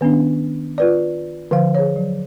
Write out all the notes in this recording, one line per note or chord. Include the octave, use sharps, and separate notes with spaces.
D#3 B3 C#4 D4
F4 B4 D5
D3 F3 F5
G#4 C#5
F#3